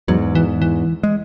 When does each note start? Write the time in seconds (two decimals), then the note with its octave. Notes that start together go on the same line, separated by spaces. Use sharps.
0.08 E2 G#2 F#3
0.35 E3
0.62 E3
1.03 G#3